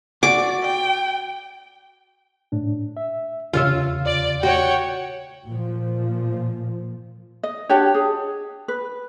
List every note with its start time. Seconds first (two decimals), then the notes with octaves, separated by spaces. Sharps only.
0.23 F#4 D5 D6
0.62 G5
2.52 A2 D4
2.97 E5
3.54 E2 C#3 F4 C#5 E5 F5
4.06 D5
4.43 F#4 C#5 F#5 G5
5.46 A#2 F3
7.43 D#5
7.69 D4 F#4 G4 C#5
7.94 G#4
8.68 B4